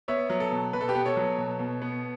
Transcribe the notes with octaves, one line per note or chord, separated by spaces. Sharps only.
B3 C#5 E5
F#3
A4
B2
B2 B4
A4
G4 B4
B3
A4 C#5
F#3
B2
B2
B3